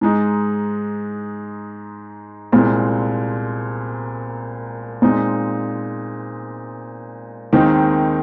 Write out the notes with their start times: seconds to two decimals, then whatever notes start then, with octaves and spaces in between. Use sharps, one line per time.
0.01 G#2 G#3 D#4
2.52 C2 A#2 G#3 C4
5.02 A#2 G#3 C4 D#4
7.52 D#2 D#3 G#3 C4 D#4